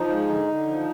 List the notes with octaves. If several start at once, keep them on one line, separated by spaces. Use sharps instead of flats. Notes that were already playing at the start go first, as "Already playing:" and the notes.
Already playing: F3 D#4
G#3
D3
D3
F3